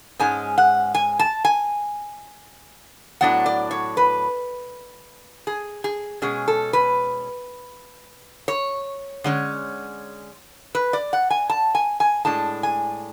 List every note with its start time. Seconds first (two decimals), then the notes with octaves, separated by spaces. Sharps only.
0.19 G#2 G#3 C#4 G#5
0.58 F#5
0.95 G#5
1.19 A5
1.45 G#5
3.21 A2 F#3 B3 D4 F#5
3.46 D5
3.71 C#5
3.97 B4
5.47 G#4
5.84 G#4
6.22 B2 G#3 C#4 G#4
6.48 A4
6.73 B4
8.48 C#5
9.24 D3 G#3 C#4
10.75 B4
10.93 D5
11.13 F#5
11.30 G#5
11.50 A5
11.75 G#5
12.00 G#5
12.25 A2 G#3 D4 A5
12.63 G#5